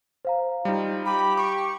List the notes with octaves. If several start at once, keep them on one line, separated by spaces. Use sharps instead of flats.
C5 F5 A#5
G3 D#4 F4
G4 B5
C#6 D6